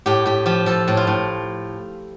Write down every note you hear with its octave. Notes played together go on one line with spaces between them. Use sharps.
A2 G4
A2 G4
F3 G4
F3 A4
A2
F4
A2